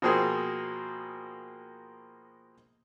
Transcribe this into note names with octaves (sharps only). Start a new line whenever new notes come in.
B2 F3 A#3 C4 G#4